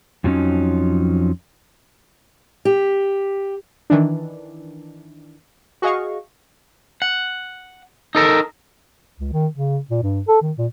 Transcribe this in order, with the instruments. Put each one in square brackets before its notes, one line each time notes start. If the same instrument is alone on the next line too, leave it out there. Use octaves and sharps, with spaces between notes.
[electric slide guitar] F2 F3 F#3 A#3 C#4 D#4
[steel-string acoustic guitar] G4
[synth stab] D#3 E3 D4
F#4 G#4 D#5 F5 C#6
[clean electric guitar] F#5
D#4 A4 A#4
[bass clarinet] C#2
D#3
C#3
A#2
G2
A4
D#3
A#2